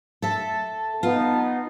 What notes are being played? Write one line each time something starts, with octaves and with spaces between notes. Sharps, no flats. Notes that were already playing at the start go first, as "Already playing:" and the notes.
A4 E5 A5
B3 D#4 F4